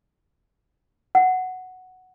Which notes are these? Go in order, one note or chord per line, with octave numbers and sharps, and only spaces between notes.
F#5